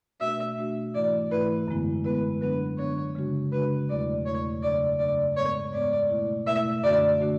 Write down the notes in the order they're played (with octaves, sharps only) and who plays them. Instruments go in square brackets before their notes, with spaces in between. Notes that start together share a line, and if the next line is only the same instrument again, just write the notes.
[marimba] B2 A3 D4 F#4 [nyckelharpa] E5
[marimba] B2 A3 D4 F#4
[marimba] G#2 E3 A3 E4 [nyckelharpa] D5
[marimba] G#2 E3 A3 E4 [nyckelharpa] B4
[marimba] F#2 D3 G#3 B3 E4
[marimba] F#2 D3 G#3 B3 E4 [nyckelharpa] B4
[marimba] D3 F#3 B3 D4 [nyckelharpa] B4
[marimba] D3 F#3 B3 D4 [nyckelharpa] C#5
[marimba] C#3 G#3 D4 F#4
[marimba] C#3 G#3 D4 F#4 [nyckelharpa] B4
[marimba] E2 B2 F#3 A3 E4 [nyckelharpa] D5
[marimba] E2 B2 F#3 A3 E4 [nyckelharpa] C#5
[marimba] F#2 C#3 F#3 A3 D4 [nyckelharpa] D5
[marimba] F#2 C#3 F#3 A3 D4 [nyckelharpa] D5
[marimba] G#2 G#3 B3 [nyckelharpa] C#5
[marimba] G#2 G#3 B3 [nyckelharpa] D5
[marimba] B2 A3 E4
[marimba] B2 A3 E4 [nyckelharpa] E5
[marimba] F#2 D3 A3 D4 F#4 [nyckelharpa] D5
[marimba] D3 A3 D4 F#4